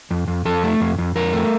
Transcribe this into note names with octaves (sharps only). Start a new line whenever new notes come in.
F2
F2
F2 A4
A3
F2
F2
F2 A#4
A3